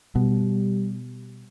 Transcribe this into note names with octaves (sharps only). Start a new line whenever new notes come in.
B2 G3